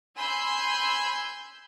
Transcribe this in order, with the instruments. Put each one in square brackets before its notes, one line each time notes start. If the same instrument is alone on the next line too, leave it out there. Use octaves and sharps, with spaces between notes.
[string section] G#5 B5 C6 E6 G6